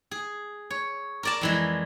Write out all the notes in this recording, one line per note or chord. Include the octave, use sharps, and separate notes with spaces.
G#4
C#5
A#4 D5 A5
F2 E3 G#3